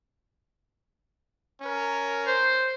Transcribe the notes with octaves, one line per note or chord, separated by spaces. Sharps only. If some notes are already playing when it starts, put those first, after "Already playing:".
C#4 A#4
C5